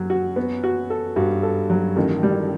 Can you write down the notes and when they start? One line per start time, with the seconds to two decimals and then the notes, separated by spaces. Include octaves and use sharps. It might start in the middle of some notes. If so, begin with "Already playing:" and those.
Already playing: F#2 F#3
0.10 F#4
0.36 B3
0.64 F#4
0.90 A4
1.16 G2 F#4
1.43 A4
1.70 F#3
1.96 A1 D#3
2.23 G3